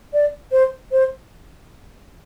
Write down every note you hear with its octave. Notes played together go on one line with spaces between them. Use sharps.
D5
C5
C5